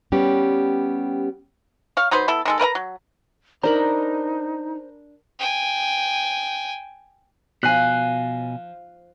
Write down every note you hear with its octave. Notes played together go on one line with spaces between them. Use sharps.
G3 B3 C#4 G4
C#5 F5
F#3 D#4 B4 C5
B3 E4 A4
D#3 G#3 A4
A#4 B4 E5 A#5
F#3
D4 D#4 A#4 C5 A#5 B5
G5 G#5
B2 F3 G#5 F#6 C7